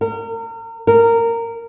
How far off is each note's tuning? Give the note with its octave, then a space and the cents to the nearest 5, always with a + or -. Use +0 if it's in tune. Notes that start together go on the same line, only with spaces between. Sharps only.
A#4 -35
A#4 -15